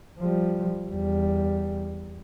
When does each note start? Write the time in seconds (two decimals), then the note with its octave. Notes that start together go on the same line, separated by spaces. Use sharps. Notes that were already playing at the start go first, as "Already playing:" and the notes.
0.19 F3 G3
0.89 E2 G3